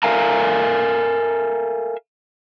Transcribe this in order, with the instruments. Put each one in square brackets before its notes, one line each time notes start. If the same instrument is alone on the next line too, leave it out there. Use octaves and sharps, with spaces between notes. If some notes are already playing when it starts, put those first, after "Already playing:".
[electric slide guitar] A4 A#4 E5 F5 G#5 A#5